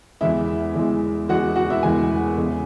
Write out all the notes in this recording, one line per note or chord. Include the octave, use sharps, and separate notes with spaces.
E2 E3 G#3 E4 E5
E2 E3 G#3
E2 E3 G#3 F#4 F#5
F#4 F#5
E4 E5
E2 E3 G#3 G#4 G#5
E2 C#3 G#3